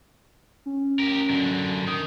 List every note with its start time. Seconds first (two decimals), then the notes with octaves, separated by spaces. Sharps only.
0.66 C#4
0.99 G4 A#4
1.30 F#2 D3
1.87 D#3 D#6